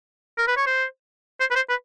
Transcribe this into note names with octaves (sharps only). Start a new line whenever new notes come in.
A#4
B4
C#5
C5
C5
B4
C5
B4